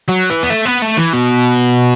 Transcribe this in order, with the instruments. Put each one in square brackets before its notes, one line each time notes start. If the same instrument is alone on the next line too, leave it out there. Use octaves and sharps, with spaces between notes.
[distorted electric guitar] F#3
E3
B3
A3
B3
A3
E3
B2